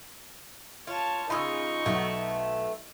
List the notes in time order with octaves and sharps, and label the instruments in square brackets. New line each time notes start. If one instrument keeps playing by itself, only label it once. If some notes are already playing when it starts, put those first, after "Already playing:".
[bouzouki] F4 [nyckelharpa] C#5 A5
[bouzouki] C#3 F4 [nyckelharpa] D#4 C#6 [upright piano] B5 E6
[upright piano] B1 F#3 [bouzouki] A3 B3